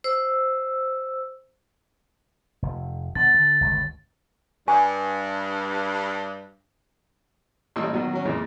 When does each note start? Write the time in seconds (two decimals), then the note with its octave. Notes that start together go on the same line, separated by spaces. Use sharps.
0.04 C5 E6
2.62 F1
3.15 B2 D3 A6
3.34 D3
3.61 G1 C#2 B2
4.68 G2 G#5
7.76 A1 A#2 G3 D#5 E6
7.94 B2 D#3 F#3
8.13 F#3 C#4
8.25 F2 A#2 C#3 E3 G#3